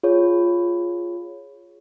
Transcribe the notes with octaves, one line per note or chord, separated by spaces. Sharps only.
F4 G#4 C#5